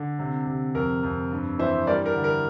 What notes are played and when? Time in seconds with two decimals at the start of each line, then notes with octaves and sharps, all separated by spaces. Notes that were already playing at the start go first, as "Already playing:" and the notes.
Already playing: D3
0.19 C3
0.46 C3
0.75 F2 A#4
1.03 F2
1.31 G2
1.59 E3 C5 E5
1.87 G3 A#4 D5
2.06 A#4
2.15 D3
2.24 A#4